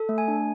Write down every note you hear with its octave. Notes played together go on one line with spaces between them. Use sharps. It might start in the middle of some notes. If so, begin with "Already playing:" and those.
Already playing: A4
A3
G#5
D4